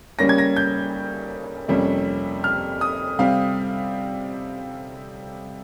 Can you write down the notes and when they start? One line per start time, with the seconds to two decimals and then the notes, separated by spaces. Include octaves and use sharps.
0.19 C#3 G3 A#3 C#4 A#6
0.29 G#6
0.38 A#6
0.56 G6
1.68 F2 C3 G3 A#3 C#4
2.44 F6
2.81 D#6
3.19 C3 G3 C4 F5